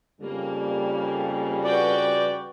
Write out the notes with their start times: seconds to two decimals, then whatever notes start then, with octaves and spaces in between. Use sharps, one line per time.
0.21 F2 C#3 G3 A#3
1.65 F#4 B4 D5 G5